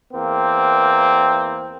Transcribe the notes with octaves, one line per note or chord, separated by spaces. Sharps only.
E2 A#3 C4